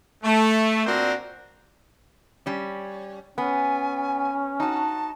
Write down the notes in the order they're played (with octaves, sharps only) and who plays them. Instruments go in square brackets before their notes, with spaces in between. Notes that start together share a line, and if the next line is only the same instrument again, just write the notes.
[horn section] A3
A#2 C4 D4 F#4 A#4 C5
[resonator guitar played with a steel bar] G3 C#4
[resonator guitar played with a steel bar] B3 [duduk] C#4 [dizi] G#5
[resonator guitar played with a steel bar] D#4 F#4 [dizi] A5